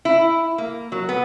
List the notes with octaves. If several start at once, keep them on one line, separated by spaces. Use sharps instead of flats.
E4
A#3
F#3
B3